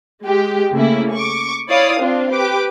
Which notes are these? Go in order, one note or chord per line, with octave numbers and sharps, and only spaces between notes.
G#3 G4
C#3 A3 A#3 C#4 E4
C#6 D6
E4 C#5 D5 F5 D#6
C4 D4 F4
G4 B4 D6